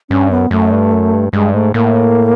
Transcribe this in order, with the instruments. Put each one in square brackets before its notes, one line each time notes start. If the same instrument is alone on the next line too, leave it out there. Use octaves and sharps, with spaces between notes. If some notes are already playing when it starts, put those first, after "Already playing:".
[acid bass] G2 [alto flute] C#4
[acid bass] F#2 [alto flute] B3
[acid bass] F#2 [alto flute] A3
[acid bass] G2
F#2
G2
[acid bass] G2 [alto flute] G#3
[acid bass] G#2 [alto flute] A3
[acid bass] A2 [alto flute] A#3